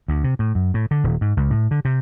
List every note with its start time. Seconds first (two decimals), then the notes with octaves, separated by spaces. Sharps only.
0.08 D2
0.24 C3
0.39 A2
0.55 F#2
0.74 A2
0.91 D3
1.04 D#1
1.21 G#2
1.37 C#2
1.50 A2
1.71 D3
1.85 C3